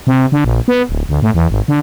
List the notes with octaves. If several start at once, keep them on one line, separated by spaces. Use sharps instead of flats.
C3
D3
A#1
B3
D1
D2
A2
E2
G#1
D3